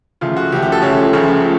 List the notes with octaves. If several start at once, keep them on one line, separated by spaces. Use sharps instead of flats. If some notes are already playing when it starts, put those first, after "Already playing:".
C#2 C#3 F3 A3 F4
F#4
C#2 C#3 F3 A3 G4
G4
A4
C#2 C#3 F3 A3 C#5
C#2 C#3 F3 A3